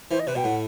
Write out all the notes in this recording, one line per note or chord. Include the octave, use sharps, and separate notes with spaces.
E3 C5
D#5
C3 B4
B2 G5
A2 F#5